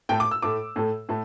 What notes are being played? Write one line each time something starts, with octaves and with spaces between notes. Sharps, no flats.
A2 A3 G5
D6
E6
A2 A3 D6
A2 A3
A2 A3